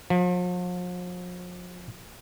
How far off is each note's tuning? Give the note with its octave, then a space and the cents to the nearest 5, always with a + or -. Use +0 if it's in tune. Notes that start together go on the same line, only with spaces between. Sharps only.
F3 +40